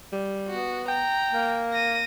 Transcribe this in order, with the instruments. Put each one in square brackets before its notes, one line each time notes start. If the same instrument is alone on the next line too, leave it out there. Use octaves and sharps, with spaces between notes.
[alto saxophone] G3
[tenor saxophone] B3 [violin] F#4
[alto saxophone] G5 [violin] A#5
[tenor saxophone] A#3
[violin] A#6 D#7